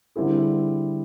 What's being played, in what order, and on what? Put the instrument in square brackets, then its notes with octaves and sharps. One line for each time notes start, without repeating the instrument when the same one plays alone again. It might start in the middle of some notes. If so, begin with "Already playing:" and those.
[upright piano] D3 G3 C4 E4 G#4